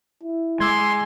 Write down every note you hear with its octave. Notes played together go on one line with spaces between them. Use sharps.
E4
G#3 C6 D6 E6 G#6